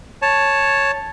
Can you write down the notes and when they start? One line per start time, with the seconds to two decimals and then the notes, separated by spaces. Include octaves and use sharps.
0.22 C#5 A5